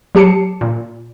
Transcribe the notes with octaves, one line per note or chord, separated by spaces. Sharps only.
F#3 G4 A5 C7 C#7
A#2